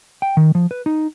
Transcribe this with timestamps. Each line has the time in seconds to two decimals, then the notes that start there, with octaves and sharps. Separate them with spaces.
0.22 G5
0.37 D#3
0.55 F3
0.71 B4
0.86 D#4